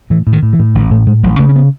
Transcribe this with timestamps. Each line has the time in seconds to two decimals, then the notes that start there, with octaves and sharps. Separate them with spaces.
0.10 A2 E3
0.27 A2
0.32 D#3
0.43 A2
0.53 E3
0.59 A2
0.75 A1 D#3
0.91 A2 A3
1.06 A2 G#3
1.23 A1 F#3
1.39 C#3 A3
1.49 C#4
1.56 B3